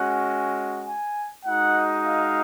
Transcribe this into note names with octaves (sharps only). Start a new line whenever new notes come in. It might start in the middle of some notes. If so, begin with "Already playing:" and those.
Already playing: G#3 C#4 F#4 F#5
G#5
G#3 D#4 F#4 F#5
F5